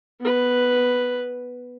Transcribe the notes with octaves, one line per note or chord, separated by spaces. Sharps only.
B3 B4